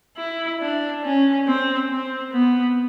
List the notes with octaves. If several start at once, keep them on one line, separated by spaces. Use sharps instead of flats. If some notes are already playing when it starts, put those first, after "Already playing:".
E4
D4
C#4
C4
C4
B3